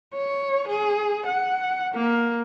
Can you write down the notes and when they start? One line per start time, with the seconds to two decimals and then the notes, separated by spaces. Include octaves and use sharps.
0.14 C#5
0.67 G#4
1.26 F#5
1.94 A#3